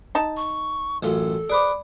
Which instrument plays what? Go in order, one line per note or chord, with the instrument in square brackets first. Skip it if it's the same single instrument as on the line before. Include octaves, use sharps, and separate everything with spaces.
[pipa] D#4 A5
[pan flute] C#6
[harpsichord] A1 F#2 F4 [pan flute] A4
[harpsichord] G#4 B4 C5 [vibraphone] D5 B5 D6